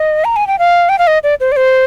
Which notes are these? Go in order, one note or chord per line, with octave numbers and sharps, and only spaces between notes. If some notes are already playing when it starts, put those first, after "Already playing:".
Already playing: D#5
A#5
G#5
G5
F5
G5
F5
D#5
D5
C5
D5
C5